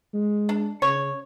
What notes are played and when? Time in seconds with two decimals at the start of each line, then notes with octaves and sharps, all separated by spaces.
0.14 G#3
0.49 D4
0.82 C#3 C#5